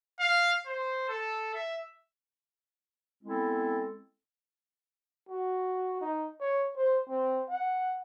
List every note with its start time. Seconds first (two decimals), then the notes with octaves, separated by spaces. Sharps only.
0.20 F5
0.67 C5
1.09 A4
1.55 E5
3.24 G#3 B3 C4 E4 A4
5.29 F#4
6.01 D#4
6.40 C#5
6.76 C5
7.09 C4
7.49 F#5